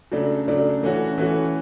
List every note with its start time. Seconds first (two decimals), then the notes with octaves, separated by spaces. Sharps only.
0.12 C#3 F#3 A3 D4
0.48 C#3 F#3 A3 D4
0.83 E3 A3 C#4 F#4
1.18 E3 A3 C#4 F#4